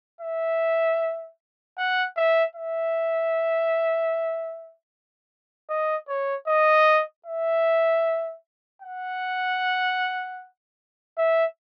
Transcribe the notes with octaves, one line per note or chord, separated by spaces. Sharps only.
E5
F#5
E5
E5
D#5
C#5
D#5
E5
F#5
E5